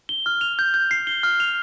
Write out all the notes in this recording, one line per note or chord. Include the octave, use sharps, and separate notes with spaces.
G7
F6
F7
G6
G6
C7
G7
F6
F7